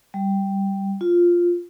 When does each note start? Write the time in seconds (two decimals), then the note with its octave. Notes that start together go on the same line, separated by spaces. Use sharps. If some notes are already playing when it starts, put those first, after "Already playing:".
0.14 G3
1.01 F4